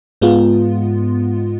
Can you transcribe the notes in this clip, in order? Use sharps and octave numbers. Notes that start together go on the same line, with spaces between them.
G#2 G#3 B3 F4